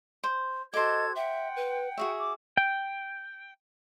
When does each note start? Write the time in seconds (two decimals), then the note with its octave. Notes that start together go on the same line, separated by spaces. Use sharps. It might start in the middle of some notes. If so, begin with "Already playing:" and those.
0.24 C5
0.74 F#4 A4 C5 D#5 D6 G#6
1.15 E5 F#5 G5
1.56 B4
1.98 F#4 G#4 E5 C#6
2.20 D6
2.57 G5